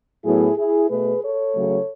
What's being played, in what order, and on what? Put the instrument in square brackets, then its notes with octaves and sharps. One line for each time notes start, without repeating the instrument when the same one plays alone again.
[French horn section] A2 F#3 B3 E4 G#4
E4 G#4
B2 A3 G#4 B4
A4 C#5
C#3 F#3 A3